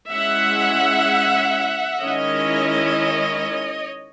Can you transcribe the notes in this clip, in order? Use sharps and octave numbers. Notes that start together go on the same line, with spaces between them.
G#3 C#4 E4 E5 F#5
D#3 G#3 C#4 E4 C#5 D#5